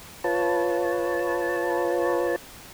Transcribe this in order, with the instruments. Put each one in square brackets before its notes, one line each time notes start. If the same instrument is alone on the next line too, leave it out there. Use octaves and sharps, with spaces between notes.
[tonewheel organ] F4 B4 C#5 A5